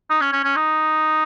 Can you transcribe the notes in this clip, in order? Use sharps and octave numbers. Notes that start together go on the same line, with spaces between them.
D#4
C#4
C#4
C#4
D#4